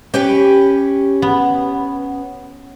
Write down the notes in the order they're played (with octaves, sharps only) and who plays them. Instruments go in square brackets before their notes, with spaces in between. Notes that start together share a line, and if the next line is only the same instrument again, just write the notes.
[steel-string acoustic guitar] C#4 [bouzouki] G4 B4 G5
[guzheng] B3